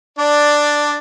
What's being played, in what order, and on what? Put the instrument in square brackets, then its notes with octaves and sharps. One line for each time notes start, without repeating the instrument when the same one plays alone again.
[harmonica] D4 D5